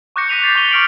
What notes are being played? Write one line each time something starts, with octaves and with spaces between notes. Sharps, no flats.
C#6 D6 F#6 G6 A#6 C#7
D6 A#6 B6 D#7 F7
A6 C7
C#6 F#6 B6 D#7 F7 G7
C#6 F6 D7 F#7